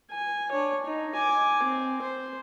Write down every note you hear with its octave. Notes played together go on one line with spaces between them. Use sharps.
G#5
D4 C#5
D#4
G#5 D6
C4
C5